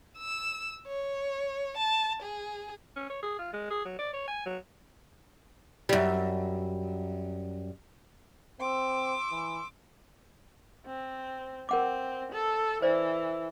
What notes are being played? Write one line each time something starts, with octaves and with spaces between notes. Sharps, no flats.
E6
C#5
A5
G#4
C#4
C#5
G#4
F4
G#3
G#4
F#3
D5
C#5
G#5
F#3
F#2 G3
C4 C6 D6 E6
E3
C4
C4 A#4 F#5 D6
A4
E3 C5 D5